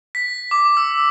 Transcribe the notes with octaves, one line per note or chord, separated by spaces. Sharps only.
B6
D6
E6